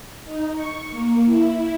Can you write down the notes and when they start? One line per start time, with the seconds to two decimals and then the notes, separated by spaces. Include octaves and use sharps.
0.25 D#4
0.56 C#6
0.90 A#3
1.25 E4